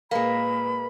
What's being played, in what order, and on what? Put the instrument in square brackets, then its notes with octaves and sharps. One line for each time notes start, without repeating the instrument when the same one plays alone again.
[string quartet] A#2 [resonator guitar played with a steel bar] G#3 A#3 [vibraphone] A#4 B4 [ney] B5